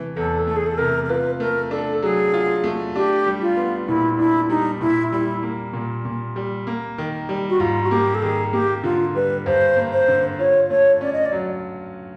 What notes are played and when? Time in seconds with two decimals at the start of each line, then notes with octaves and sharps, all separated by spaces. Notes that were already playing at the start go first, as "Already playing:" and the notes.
Already playing: C3 E3 A3
0.16 E2 A4
0.47 A3 A4
0.56 G#4
0.66 A4
0.78 C3 A#4
1.05 A#4
1.09 F4 B4
1.40 A3 A#4
1.71 D4 A4
2.02 F#3 G#4
2.33 F4
2.64 A3
2.95 D4 G4
3.26 G3
3.42 F4
3.57 B3
3.88 A#2 E4
4.19 D4 E4
4.49 G3 D#4
4.81 A#2 E4
5.12 G3 E4
5.43 A#3
5.73 A#2
6.05 A#2
6.36 G3
6.67 A#3
6.98 D#3
7.29 G3
7.50 F#4
7.60 G#2 F4
7.83 F#4
7.91 A#3 G4
8.15 A4
8.22 D#3 G#4
8.52 A#3 G4
8.83 D3 F4
9.15 G3 B4
9.46 G2 C5
9.77 A#3
9.93 C5
10.08 D3
10.39 F4 C#5
10.70 A3 C#5
11.01 C#4 D5
11.13 D#5
11.25 D5
11.32 F#3